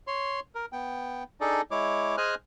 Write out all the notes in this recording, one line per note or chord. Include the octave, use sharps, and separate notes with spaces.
C#5 C6
A#4
B3 G5
D4 D#4 G#4 A4 D5
G#3 E4 C#5 D6
G#4 C5 D#5 G#5 F6 F#6